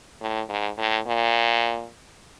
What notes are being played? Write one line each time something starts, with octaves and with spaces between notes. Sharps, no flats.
A2
G#2
A2
A#2